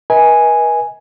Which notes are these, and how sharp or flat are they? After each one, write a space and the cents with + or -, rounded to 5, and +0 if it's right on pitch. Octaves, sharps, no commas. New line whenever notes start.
B4 -40 D#5 +45 G#5 +0